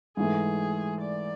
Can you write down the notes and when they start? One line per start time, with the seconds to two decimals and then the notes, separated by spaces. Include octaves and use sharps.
0.17 G#2 E3 A3 G#4
1.02 D5